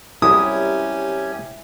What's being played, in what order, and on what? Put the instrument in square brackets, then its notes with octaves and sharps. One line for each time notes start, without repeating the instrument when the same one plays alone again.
[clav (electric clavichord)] C2 F#3 [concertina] C#4 G4 G#5 [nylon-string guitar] E4 [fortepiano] D#6